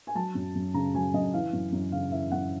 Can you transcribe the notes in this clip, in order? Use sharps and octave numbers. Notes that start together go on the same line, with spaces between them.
G#5
F#3 A5
F#2
F#2
C#3 A#5
F#3 G#5
F#2 D#5
E3 F5
F#2
F#2
C#3 F5
E3 E5
F#2 F#5